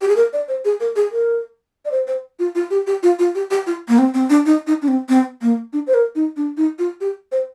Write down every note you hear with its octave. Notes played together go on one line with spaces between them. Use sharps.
G4
G#4
A#4
D5
C5
G#4
A#4
G#4
A#4
D5
C5
C5
F4
F4
G4
G4
F4
F4
G4
G4
F4
A#3
C4
C4
D4
D#4
D#4
D4
C4
C4
A#3
D4
C5
A#4
D#4
D4
D#4
F4
G4
C5